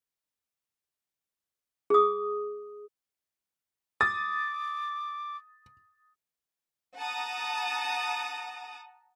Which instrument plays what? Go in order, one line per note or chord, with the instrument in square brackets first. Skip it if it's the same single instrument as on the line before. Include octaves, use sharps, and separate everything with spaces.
[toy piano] G#4 D#6
[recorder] D6 [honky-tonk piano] D#6 [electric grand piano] A6
[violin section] F#5 A5 A#5 D#6